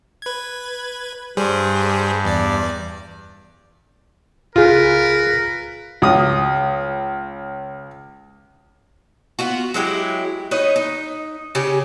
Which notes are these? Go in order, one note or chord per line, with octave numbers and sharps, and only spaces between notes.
B4 G#6
G2 G3 G#4 C5
E2 D5
C#2 F4 G#4 A#4 B4
C#2 D#6
B3 F4 F#4
F#3 G#3 E4 G4
D#4 B4 C#5 D#5
D#4
C#3 C#4 G4